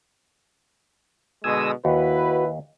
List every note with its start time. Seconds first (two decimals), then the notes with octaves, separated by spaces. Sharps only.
1.44 B2 D3 G#3 G#5 D#6 E6
1.85 D#2 E4 F#4 B4